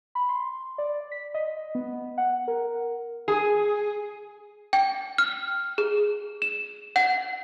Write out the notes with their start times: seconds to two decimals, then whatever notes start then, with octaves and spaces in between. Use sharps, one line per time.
0.15 B5
0.29 C6
0.78 D5
1.12 B6
1.34 D#5
1.75 B3
2.18 F#5
2.48 A#4
3.28 G#4
4.73 G5
5.18 F6
5.78 G#4
6.42 E7
6.96 F#5